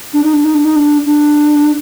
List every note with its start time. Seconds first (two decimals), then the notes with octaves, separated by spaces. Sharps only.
0.14 D4
0.24 D#4
0.33 D4
0.45 D#4
0.55 D4
0.65 D#4
0.76 D4
1.06 D4